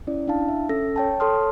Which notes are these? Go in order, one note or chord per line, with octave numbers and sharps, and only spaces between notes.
C#4 E4 D5
D4 E4 F5 A5
E5
C#4 A4 E6 A#6
C#5 G5 A5
A4 C#5 A5 C6 D#6 F6